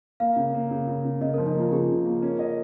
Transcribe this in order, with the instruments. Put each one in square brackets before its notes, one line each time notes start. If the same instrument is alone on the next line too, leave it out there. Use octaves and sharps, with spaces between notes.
[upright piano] A#3 [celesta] F5
[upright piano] C#3
A#3
C#3
C#3
C#3
[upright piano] C#3 [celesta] D#5
[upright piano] F3 [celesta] A#4
[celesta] D#4
[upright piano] A#3 [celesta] F4
[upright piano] C#3 [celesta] G#4
[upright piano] C#3
A#3
C#4
D#5